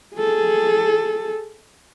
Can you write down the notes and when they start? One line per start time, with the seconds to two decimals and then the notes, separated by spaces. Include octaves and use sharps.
0.15 G#4 A4